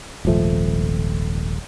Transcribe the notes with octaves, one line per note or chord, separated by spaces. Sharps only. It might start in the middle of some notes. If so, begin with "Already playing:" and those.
D#1 G#1 F3 A3